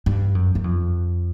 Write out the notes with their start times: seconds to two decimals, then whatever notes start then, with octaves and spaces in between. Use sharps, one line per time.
0.06 G2
0.35 F#2
0.55 F#2
0.64 F2